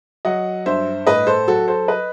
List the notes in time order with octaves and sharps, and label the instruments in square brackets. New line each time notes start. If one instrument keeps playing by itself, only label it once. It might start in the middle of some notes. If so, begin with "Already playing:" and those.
[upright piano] F#3 D#5 F#5
G2 C5 E5
A2 B4 D#5
A4 C5
F#3 F#4 A4
A4 C5
B4 D#5